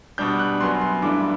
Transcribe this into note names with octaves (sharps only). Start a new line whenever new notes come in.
B2 G3 D4 G6
F#6
F#2 F#3 B3 C6
C6
G2 E3 A3 D4 D6